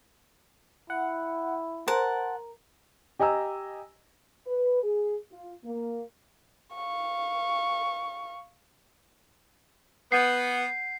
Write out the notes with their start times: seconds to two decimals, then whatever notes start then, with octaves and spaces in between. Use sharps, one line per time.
0.90 E4 F#5
1.88 A#4 C5 F#5 A5
3.19 G4 D#5 G#5 A#5 E6
4.46 B4
4.84 G#4
5.32 F4
5.64 A#3
6.74 F5 C#6
10.12 B3 F#5 G6 C7 D#7